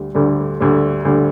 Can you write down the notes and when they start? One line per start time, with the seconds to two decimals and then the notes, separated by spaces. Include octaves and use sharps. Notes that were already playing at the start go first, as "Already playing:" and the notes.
Already playing: D2 D3 G3
0.15 D2 D3 G3
0.60 D2 D3 G3
1.05 D2 D3 G3